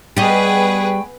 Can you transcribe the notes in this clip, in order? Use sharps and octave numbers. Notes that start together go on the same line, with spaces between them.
G3 B3 G#4 B4 D#5 G5 B5 C#6